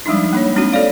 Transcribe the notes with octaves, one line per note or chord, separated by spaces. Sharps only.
F3 G3 G#3 D4 D#4
A#3 D4 C#5
G#3 C4 D4 F#4
A4 C#5 D5 F5